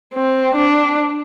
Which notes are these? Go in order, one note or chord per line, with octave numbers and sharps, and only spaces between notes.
C4
D4